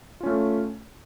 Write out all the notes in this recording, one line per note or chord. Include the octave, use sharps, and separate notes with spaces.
A3 C#4 F4